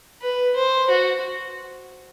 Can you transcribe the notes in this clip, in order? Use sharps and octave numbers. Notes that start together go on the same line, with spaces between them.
B4
C5
F#4